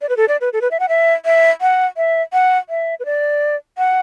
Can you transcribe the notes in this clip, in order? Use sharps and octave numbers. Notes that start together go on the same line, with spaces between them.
D5
B4
A4
D5
B4
A4
B4
E5
F#5
E5
E5
F#5
E5
F#5
E5
B4
D5
F#5